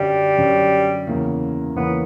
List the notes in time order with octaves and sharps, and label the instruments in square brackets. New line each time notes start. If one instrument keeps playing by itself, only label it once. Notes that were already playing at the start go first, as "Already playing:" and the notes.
Already playing: [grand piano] F#2 D3 F#3 C#4 [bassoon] G3
[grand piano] F#2 D3 F#3 C#4
E2 C#3 E3 A#3 C#4
[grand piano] E2 C#3 E3 A#3 C#4 [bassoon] B3